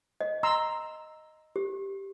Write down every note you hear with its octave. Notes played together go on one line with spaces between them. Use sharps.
D#5
A#5 C6 E6
G4